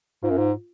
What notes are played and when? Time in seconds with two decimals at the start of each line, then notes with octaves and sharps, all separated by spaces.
0.23 G#2 F4
0.30 F#2
0.38 G#2